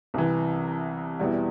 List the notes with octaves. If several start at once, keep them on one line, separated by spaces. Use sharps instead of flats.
C2 C3 E3
E2 B2 G3 B3 E4